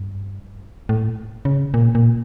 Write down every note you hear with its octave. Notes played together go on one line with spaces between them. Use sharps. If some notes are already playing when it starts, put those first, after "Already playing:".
Already playing: G2
A2
C#3
A#2
A#2